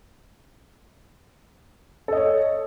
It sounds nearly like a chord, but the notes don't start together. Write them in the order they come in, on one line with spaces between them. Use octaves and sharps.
A4 D#5 C#5